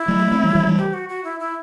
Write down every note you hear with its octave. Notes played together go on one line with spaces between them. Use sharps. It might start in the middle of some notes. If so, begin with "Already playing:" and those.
Already playing: E4
F#3 A3
A3 C4
E3 G3
E3 G3
E3 G3
G4
F#4
F#4
E4
E4